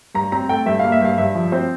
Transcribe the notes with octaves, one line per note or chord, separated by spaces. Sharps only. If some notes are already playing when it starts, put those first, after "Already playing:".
G2 A#5
C4 A#5
A3 G5
G2 E5
A#3 F5
E5
G2 F5
G2 E5
F3
C4 C5